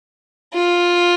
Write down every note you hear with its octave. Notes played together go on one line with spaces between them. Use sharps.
F4